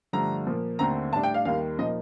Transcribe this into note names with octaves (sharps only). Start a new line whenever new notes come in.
G2 D3 F3 A3 A#5
A#2 F3 A#3
D#2 D3 A3 C4 A#5
A2 G3 D4 A5
G5
F5
D#2 D#3 G3 F5
A#2 F3 A#3 D#4 D#5